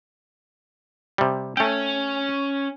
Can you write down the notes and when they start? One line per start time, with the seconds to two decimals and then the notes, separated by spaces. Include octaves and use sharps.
1.18 C3 G3
1.57 A3 C#4 G5